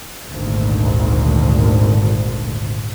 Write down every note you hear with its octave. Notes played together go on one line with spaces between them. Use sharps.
G#1 D2 A#2